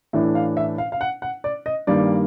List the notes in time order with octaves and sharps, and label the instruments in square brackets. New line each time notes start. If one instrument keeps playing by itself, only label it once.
[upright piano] A2 E3 A3 D4 E5
F5
E5
F5
F5
F#5
F#5
D5
D#5
G2 D#3 G3 A#3 D5